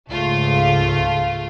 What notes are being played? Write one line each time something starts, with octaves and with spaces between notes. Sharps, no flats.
C#2 G#2 A3 F4